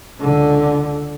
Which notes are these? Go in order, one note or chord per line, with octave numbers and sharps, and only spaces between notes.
C#2 D3